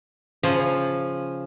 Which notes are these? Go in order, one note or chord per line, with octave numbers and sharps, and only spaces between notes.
C#3 F3 G#5